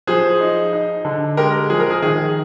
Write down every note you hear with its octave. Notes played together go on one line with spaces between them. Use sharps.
F3 G#4 C5
D#4
D#4
D3
G#3 G4 A#4
F3 G#4
A#4
G#4
D#3 G#4